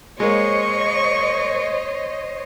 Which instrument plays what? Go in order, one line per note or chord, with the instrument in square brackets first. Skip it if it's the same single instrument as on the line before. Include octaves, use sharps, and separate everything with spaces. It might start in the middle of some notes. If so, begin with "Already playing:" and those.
[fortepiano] G#3 A#3 [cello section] C5 C#5 D#5 [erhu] C#6